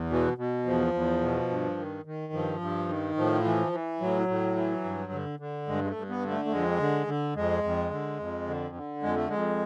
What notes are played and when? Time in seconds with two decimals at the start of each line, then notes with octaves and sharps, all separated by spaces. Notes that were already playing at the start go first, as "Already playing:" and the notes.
Already playing: E2
0.10 B2 E3
0.38 B2
0.65 E2 F3
0.94 E2
1.21 B2
1.49 G2
1.77 D#3
2.05 D#3
2.33 G2 F3
2.61 G2
2.89 D#3
3.17 A2 F3
3.44 E3
3.72 E3
4.00 A2 F#3
4.28 A2
4.56 E3
4.84 G2
5.12 D3
5.39 D3
5.68 G2 G#3
5.84 G#3
5.89 A3
5.96 G2
6.09 B3
6.24 D3
6.31 A3
6.45 A3
6.51 F2 G#3
6.79 D3
7.07 D3
7.35 F2 G#3
7.63 F2
7.91 D3
8.19 F2
8.47 D3
8.75 D3
9.02 F2 G#3
9.16 A3
9.28 F2 G#3